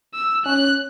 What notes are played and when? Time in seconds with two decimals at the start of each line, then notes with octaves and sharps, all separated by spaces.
0.14 E6
0.46 C#4 F#6